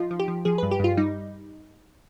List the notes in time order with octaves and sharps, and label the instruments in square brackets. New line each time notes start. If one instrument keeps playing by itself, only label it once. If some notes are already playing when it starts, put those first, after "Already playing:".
Already playing: [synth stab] F3 D#4 F4
F3
G4
F3
F3 G#4
G2 B4
G4
G2 F4
G3 D#4